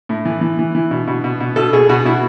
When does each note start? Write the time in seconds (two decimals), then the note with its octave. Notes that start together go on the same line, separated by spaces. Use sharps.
0.09 A2
0.25 E3
0.41 E3
0.59 E3
0.75 E3
0.91 B2
1.08 B2
1.24 B2
1.40 B2
1.56 B2 A4
1.73 B2 G#4
1.89 B2 F#4
2.05 B2 E4